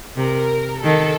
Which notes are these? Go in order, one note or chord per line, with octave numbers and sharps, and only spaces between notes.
C3 A#4
D#3 A4